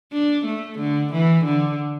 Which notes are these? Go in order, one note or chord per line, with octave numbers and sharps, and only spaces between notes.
D4
A3
D3
E3
D3